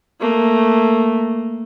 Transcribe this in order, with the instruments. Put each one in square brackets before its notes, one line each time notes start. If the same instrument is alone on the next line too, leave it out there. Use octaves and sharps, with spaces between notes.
[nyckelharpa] A3 A#3